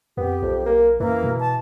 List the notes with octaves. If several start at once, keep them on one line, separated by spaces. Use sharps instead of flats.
F2 B3 G4
B1 F2
A#3
F#2 E3 A#3
B2
A5